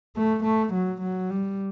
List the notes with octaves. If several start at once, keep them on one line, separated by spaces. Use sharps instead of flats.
A3
A3
F#3
F#3
G3